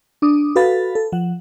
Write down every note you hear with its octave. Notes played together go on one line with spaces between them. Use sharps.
D4 D6 D#6
F#4 A4 B4 F5 B5 A6
A4
F3 F#5